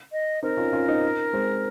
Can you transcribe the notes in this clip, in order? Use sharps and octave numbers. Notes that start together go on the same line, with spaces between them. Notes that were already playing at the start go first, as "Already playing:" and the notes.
D#5
C4 D#4 A#4
C#4 F4
C#4 F4
C4 D#4
G#3 C4